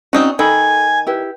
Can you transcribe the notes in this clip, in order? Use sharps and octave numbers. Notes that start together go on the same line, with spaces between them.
C4 C#4 D#4 F#4 D5 G#5
D#3 A4 G#5 B5
E4 G4 B4